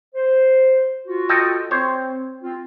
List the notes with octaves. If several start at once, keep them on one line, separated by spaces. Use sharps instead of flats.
C5
F4 F#4
A4 D#5 G5
C4 C5 C#5
C4 F4